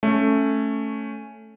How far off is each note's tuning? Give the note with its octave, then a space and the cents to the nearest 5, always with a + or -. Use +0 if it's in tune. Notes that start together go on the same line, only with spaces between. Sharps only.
A3 +0 C#4 +0